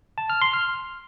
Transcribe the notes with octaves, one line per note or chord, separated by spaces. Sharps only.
A5
F6
C6
F6